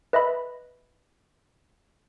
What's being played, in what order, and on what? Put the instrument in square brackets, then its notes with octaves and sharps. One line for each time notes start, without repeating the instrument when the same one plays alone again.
[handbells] B4 D#5 E5 B5